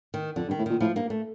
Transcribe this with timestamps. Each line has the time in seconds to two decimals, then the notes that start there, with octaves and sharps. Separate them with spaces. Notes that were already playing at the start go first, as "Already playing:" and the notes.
0.14 D#3
0.36 F2 D3
0.48 G2
0.51 D#3
0.59 A2
0.66 A#2 D#3
0.80 A2 F3
0.95 G2 A#3
1.10 A3